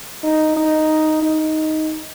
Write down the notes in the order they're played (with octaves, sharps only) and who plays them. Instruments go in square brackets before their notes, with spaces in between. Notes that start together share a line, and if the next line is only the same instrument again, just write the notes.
[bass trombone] D#4
D#4
D#4